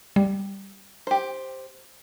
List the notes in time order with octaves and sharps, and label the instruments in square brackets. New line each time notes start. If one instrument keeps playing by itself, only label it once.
[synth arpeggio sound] G3
[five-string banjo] G4 C5